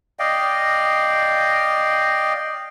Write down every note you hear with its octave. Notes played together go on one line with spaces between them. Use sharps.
D5 D#5 F5 G5